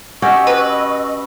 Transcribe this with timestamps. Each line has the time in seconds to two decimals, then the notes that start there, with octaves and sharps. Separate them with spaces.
0.22 C#4 F#4 G4 D#5 C#6 E6
0.47 B4